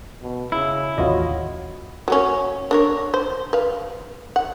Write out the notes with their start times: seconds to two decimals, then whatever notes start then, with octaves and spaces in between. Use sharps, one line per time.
0.22 B2
0.52 C#3 E4
0.98 A1 D#2 C#4 F4 F#4 C#5 D#5
2.08 F#3 A#3 C#4
2.71 D4 A#4 C#5
3.14 C5
3.53 B4 F5
4.36 F#5